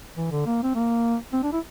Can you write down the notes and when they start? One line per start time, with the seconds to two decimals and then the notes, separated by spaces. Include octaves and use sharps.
0.17 E3
0.31 D3
0.46 A#3
0.63 C4
0.75 A#3
1.33 C4
1.43 D4
1.52 E4